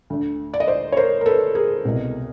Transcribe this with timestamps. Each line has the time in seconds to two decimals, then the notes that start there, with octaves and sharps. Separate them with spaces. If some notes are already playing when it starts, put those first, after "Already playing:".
0.10 D2 D3
0.54 D5
0.60 D#5
0.68 C5 D5
0.92 C#5
0.97 A#4 C5
1.21 A#4
1.26 A4 B4
1.55 G#4 A#4
1.85 C2 B2